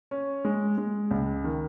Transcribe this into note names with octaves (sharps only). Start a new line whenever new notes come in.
C#4
G#3
G#3
C#2
D#3